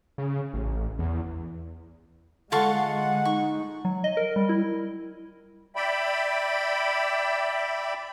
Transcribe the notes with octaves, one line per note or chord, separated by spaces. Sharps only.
C#3
A1
E2
D3 G#3 F4 A4 F#5 C#6
D#4 C#6
F#3
D#5
A#4
G3
E4
D5 E5 G5 B5